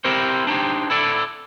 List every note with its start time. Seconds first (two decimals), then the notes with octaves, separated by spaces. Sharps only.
0.04 C4 E4 G4 A#4 C5
0.47 D4 D#4 G4 C5
0.90 E4 A4 D5